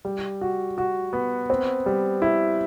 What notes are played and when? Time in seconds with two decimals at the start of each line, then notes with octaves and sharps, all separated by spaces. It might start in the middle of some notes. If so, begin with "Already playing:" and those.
0.05 G3
0.41 F#4
0.78 F#4
1.13 B3
1.50 C4
1.86 G3
2.22 E4